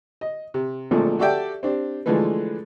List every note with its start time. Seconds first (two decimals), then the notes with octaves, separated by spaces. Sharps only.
0.21 D#5
0.54 C3
0.91 G#1 A#2 D3 F3 A3
1.19 F#4 G4 A4 D5 E5 G5
1.63 C4 D4 G4
2.06 D3 E3 F3 G#3 A3 B4